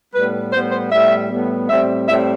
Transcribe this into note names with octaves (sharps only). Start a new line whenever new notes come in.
A2 G3 B3 B4
A2 G3 B3 C5
C5
A2 G3 B3 E5
A2 G3 B3
A2 G3 C4 E5
A2 G3 C4 E5